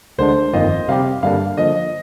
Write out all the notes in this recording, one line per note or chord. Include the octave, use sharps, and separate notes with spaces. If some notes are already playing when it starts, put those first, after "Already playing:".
D2 D3 G#3 D4 C5
G1 F2 D#3 A#3 F4 D#5
C3 G3 C4 G4 F5
G2 D3 G3 A#3 D4 F5
D3 F3 A#3 D#5